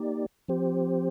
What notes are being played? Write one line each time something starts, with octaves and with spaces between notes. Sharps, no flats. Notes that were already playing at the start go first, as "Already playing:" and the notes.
Already playing: A#3 D#4 G4 D5
F3 C4 G4 C5